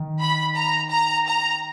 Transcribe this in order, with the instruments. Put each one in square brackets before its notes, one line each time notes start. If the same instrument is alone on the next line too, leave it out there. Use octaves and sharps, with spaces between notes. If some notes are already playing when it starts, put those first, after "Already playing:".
Already playing: [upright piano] D#3
[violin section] B5
A#5
A#5
A#5